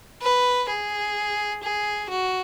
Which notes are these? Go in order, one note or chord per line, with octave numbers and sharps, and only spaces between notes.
B4
G#4
G#4
F#4